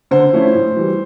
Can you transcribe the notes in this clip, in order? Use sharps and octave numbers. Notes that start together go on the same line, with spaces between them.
D3 C5
F3 A3 C#4 E4
A2
E3 G3